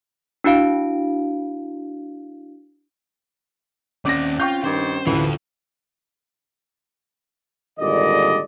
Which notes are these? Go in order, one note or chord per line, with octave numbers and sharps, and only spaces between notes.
D4 E4 F#4 F5 D7
D#2 C4 C#4 C#5 D5 D6 A#6
F4 G5 C#6 G6
G2 D#3 C5
A1 D2 E3 F4 A4 B4
G#1 A#2 D3 G3 D5 D#5